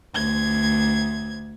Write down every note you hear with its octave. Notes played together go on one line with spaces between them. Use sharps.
D2 G#6